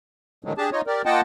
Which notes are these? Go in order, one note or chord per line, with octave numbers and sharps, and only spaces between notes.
A2 D3 D#3 F3 F#3 G#3
D4 G4 G#4 A5
D#4 F4 C#5 D#5
G4 A#4 D5
A#3 F4 D#5 F#5 G5 A5